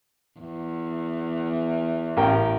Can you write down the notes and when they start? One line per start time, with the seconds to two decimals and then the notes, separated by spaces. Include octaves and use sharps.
0.40 E2
2.17 A1 A#4 G5